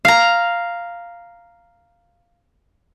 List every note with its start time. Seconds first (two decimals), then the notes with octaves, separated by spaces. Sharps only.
0.05 F5 A#5